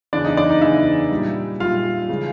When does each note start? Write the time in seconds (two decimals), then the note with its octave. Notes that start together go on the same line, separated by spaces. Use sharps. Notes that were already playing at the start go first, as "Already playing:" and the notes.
0.13 E2 C#3 E3 D4 D5
0.24 D#4 D#5
0.37 D4 D5
0.49 D#4 D#5
0.62 E2 C#3 E3 E4 E5
1.10 A#2 G3
1.60 A#2 G3 F4 F5
2.09 C#3 E3 G#3